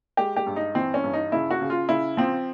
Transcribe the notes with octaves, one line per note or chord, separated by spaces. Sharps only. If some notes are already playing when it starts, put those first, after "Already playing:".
G#3 G4
G4
G2
D#4
E3 C4
C#4
G2
D#4
C#3 E4
F#4
C#3
F4
C#3 E4
F3 C4